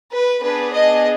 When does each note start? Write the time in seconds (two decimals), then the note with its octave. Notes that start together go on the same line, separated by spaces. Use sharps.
0.11 B4
0.41 B3 D4 G#4 B4
0.73 D#5